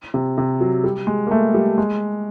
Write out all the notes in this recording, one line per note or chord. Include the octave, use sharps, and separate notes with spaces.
C3
C3
F#3
G3
G#3
A#3
A3
G3
G#3